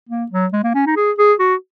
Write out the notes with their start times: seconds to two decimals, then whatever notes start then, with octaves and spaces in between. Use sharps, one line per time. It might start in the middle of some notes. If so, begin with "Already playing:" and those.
0.09 A#3
0.32 F#3
0.53 G#3
0.64 A#3
0.75 C#4
0.86 D#4
0.97 G#4
1.18 G#4
1.40 F#4